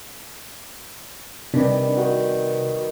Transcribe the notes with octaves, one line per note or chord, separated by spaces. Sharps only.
C3 D#3 G3 D4 B4
D#3 F#4